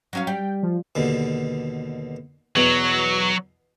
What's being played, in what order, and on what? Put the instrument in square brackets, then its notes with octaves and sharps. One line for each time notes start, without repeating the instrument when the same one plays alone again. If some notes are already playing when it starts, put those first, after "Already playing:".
[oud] F#3 C#4 F5
[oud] G3 [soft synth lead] G5
[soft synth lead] F3
[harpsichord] D#2 B2 D3
[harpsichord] E2 B2 [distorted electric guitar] F#3